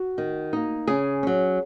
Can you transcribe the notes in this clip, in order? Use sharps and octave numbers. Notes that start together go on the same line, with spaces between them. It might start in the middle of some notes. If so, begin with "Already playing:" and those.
Already playing: F#4
D#3
A#3 D#4
C#3 G#4
F#3 C#4